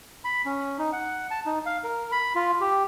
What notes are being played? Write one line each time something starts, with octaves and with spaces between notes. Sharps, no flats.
B5
C#4
D#4
F#5
A5
D#4
F5
A#4
B5
F4
G4